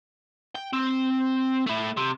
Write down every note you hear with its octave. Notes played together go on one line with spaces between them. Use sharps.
G5
C4
A3 E4
C3